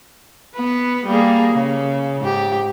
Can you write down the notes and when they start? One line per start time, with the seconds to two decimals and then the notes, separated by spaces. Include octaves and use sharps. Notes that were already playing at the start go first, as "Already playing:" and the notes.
0.56 B3 B4
1.06 G3 A#3 G#4
1.53 C#3
2.21 G#2 G4